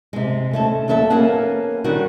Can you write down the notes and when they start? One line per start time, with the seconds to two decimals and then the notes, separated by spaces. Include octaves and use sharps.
0.13 C3 G#3
0.53 A3 C#4 A4
0.88 D#2 F#3 A4 E5 A5
1.10 A#3 B3 C#4 G#4 F#5
1.84 D3 D#3 G3 C#4 F#4